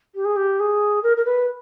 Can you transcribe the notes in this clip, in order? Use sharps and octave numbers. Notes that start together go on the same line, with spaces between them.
G4
G#4
G4
G#4
A#4
A#4
B4